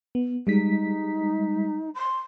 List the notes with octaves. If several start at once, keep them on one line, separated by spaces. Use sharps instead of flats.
B3
G3 G#3 D#4 B6
C6